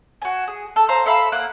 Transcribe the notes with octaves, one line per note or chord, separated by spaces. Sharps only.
F#4 G#5
G#4
A4
C5 F5 A#5
A4 E5 F5 B5
A#3 F#5